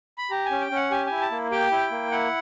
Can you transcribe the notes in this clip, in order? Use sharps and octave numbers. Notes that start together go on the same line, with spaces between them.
B5
G4 A#5
G#5
C#4
G5
C#4
F#5
G4 G#5
E4 G#5
A5
A#3
G4 G5
E4
A#3
E4 F#5